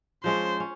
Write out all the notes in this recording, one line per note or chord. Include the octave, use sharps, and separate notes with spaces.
F3 G#3 C#4 C5
C#4